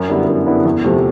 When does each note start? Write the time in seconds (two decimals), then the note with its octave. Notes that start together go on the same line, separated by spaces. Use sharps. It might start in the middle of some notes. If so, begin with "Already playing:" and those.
Already playing: F#2
0.09 D3 G3 B3 E4
0.27 F#2
0.46 D3 G3 B3 E4
0.65 E2
0.84 C3 F3 A3